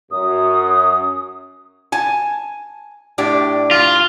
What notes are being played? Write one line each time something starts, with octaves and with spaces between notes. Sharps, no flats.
F#2 D#6
G#5 A5
A2 D4 G4
F4